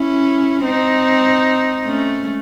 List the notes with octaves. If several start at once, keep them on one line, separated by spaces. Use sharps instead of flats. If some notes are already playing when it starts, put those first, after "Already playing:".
Already playing: C#4 E4
C4 D#4
A3 C#4